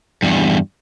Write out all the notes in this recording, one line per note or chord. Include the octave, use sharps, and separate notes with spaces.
E2 G2